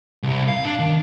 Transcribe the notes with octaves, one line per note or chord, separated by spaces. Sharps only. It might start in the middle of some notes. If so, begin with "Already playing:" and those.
C2
F5
D4
D#3